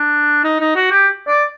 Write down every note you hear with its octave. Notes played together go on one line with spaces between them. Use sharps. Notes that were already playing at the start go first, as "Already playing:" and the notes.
Already playing: D4
D#4
D#4
F#4
G4
D5